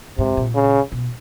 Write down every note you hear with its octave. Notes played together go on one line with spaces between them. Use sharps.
G#2 C3
A#2
C#3
B2